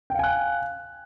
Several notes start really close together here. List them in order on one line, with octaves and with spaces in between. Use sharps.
G5 F5 G#5 F#6